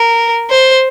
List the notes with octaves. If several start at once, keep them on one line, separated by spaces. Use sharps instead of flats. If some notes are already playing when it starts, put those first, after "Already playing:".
Already playing: A#4
C5